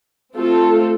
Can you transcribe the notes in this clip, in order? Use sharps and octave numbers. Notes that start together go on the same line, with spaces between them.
A3 C4 F4 A4